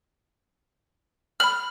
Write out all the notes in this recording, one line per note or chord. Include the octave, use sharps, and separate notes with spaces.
B5 F6 F#7